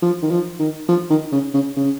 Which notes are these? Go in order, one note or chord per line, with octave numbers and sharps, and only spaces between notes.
F3
D#3
F3
D#3
F3
D#3
C#3
C#3
C#3